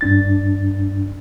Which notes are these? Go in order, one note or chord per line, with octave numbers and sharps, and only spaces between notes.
G2 D4 A6